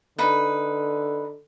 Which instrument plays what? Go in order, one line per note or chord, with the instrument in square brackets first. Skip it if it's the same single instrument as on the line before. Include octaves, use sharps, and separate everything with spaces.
[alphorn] D3 [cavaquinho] D#4 B4